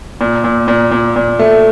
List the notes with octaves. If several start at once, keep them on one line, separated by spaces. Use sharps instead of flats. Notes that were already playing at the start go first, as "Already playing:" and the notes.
A#2
A#2
A#2
A#2
A#2
A3